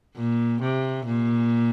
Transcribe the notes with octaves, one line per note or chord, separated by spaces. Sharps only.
A#2
C3
A#2